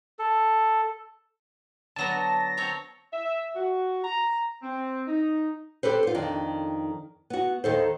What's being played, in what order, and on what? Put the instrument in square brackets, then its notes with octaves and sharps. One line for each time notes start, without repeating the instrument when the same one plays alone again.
[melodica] A4
[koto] D3 F#3 B3 [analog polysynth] A5 A#6
[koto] C4 C#5 A#5
[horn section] E5
F#4
A#5
C4
D#4
[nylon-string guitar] G4 A4 B4 C5
F4 C5
F2 D#3 D4
B3 F#4
D#2 D#3 A4 C5